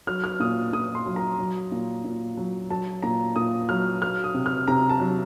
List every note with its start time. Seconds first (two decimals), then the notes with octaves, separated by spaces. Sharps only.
0.07 F#3 F6
0.24 F6
0.40 A#2 D#6
0.73 A#2 D#6
0.95 C6
1.06 F#3
1.16 A#5
1.38 F#3
1.72 A#2
2.04 A#2
2.37 F#3
2.70 F#3 A5
3.03 A#2 A#5
3.36 A#2 D#6
3.69 F#3 F6
4.02 F#3 F6
4.24 D#6
4.34 C3
4.46 F6
4.68 C3 A#5
4.89 A5
5.00 F#3